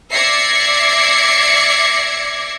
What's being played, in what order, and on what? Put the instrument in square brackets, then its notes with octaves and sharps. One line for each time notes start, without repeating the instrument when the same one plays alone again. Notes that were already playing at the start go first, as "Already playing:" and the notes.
[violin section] D5 E5 G#6 A#6 C7 C#7